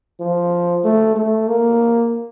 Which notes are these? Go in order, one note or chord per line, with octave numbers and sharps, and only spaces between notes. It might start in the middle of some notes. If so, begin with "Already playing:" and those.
F3
A3
A3
A#3